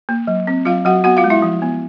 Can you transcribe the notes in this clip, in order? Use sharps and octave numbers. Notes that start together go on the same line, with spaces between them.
A#3
F#3
C4
F#3 F4 F5
F#3 F#4 F#5
B3 F#4 F#5
F4 F5
G#3
E4 E5
F3
B3